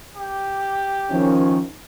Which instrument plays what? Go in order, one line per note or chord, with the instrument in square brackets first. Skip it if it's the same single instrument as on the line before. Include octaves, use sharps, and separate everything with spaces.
[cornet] G4
[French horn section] D#3 F3 C#4